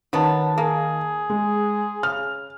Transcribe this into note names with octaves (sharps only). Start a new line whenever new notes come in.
D#3 F#3 B3 A5
A#3 G#4
G#3
C#3 F6